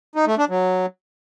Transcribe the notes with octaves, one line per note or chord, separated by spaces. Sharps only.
D#4
A3
D4
F#3